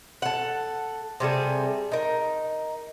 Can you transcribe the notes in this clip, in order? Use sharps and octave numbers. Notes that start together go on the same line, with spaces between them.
A4 F#5
C3 G3 G#4 A4
D#4 A#4